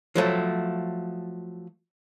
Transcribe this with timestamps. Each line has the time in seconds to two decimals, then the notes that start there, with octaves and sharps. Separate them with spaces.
0.15 F3 F#3 A3